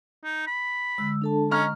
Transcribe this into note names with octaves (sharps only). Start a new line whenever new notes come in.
D#4
B5
D3 G#3 E6
D4 A4 A5
C#4 D#5 A#5 C#6 F6